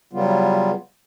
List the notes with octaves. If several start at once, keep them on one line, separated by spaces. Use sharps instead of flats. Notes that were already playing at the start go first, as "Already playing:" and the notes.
C#3 F#3 G3 B3 F4